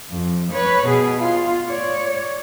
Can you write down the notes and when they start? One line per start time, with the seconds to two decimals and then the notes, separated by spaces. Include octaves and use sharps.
0.11 F2
0.53 B4 C#5
0.87 B2 G#4
1.19 F4
1.70 C#5 D5